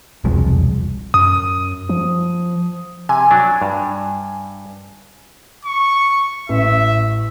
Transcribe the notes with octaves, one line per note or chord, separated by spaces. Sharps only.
E1 C2 F2 G#3
F#2 D#6
F3
C3 G#5
F#3 D4
G2
C#6
A1 E5